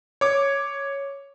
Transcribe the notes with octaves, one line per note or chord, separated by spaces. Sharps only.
C#5 D6